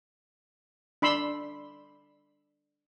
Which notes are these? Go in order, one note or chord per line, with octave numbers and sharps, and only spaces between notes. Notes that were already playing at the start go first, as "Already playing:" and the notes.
D4 B5 C6 E6